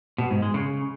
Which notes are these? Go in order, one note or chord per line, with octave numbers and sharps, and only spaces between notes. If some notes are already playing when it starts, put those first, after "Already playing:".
B2
G#2
G#3
C#3